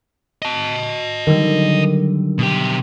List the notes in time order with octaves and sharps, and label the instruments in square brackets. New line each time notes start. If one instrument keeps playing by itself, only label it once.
[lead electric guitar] D#5 A5
[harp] D3 F#3 G3 [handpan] D#3
[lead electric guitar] B2 G4